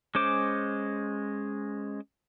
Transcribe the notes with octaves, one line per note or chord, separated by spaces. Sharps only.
G#3 C#4 C5 D6